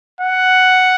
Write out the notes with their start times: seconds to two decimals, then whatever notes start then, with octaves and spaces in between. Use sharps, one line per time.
0.21 F#5